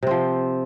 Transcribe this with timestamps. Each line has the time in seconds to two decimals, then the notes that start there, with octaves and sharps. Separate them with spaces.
0.03 C3
0.07 C4
0.11 F3